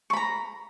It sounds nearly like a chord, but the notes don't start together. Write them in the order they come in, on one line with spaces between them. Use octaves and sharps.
C#6 B5 A#5